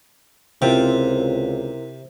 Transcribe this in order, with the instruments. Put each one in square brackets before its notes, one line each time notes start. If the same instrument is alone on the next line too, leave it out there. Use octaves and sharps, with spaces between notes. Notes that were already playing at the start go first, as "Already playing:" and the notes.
[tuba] C#2 [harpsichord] C3 [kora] C4 F4 [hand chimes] E4 A#4 C5